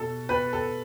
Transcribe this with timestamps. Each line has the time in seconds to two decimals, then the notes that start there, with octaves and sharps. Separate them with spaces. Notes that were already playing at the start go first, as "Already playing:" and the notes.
Already playing: B2 A4
0.29 B2 B4
0.53 A4